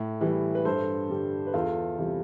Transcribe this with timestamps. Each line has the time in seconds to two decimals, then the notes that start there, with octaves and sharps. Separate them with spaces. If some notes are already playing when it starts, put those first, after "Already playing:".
Already playing: A2
0.21 E3 G3
0.55 B4
0.65 G2 A4 C5
1.10 D3 G3
1.47 B4
1.54 E2 F4 A4
1.98 C3 E3 G3